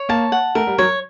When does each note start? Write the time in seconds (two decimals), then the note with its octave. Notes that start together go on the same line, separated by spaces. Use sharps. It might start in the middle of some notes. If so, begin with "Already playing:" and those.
Already playing: C#5
0.09 A#3 A5
0.32 F#5
0.55 A3 A#4
0.67 G3
0.78 F#3 C#5